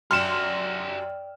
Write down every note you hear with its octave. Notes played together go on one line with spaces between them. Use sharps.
F#2 G4 D5 F#5 G5 C6 F6 E7